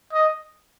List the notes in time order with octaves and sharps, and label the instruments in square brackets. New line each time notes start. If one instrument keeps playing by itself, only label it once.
[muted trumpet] D#5